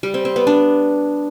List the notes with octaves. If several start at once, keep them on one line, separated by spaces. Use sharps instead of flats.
G3
C4
C4
B3
D4